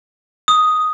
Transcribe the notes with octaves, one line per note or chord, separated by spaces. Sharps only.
D#6